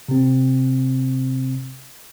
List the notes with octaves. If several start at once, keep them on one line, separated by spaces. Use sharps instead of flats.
C3 C4